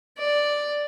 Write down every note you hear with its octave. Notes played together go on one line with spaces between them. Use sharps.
D5